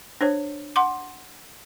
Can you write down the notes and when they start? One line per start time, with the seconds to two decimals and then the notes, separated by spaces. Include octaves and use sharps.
0.21 D4 C5 C#5
0.76 F#5 C6 D6